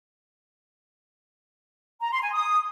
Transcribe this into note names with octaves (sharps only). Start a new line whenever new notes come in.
A#5
C6
G#5
D#6